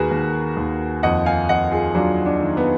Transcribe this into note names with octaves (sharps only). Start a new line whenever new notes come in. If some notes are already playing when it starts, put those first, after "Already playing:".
Already playing: D#2 F#4 G#4 A#4 B4
D#2
D#2
F2 D#5 F#5
F5 G#5
F2 D#5 F#5
F4 G#4
F#3 D4 F4
D4
D#3
B3